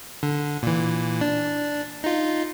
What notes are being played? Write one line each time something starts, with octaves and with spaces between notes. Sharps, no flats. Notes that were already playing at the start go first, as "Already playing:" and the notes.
D3
A#2 E3
D4
D#4 F4